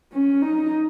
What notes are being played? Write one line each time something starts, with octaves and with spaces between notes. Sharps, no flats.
C#4
D#4